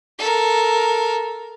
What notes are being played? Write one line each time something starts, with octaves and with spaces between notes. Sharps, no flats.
A4 A#4